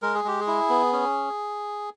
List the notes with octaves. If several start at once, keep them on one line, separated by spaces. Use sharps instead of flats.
G#3 A#4
G#4
G#3 G4
G#4
E4
B3
C#4